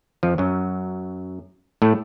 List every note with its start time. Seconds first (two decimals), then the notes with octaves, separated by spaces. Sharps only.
0.23 F2 F3
0.38 F#2 F#3
1.82 A2 A3